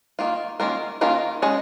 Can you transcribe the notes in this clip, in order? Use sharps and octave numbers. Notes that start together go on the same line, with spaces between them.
D#3 A#3 F4
D#3 A#3 C#4 F4 A#4
D#3 A#3 C#4 F4 A#4
G#3 C#4 G#4 D#5